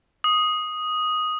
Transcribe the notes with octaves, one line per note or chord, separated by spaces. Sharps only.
D#6